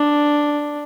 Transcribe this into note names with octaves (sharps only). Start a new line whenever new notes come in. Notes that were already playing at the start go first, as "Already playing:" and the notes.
Already playing: D4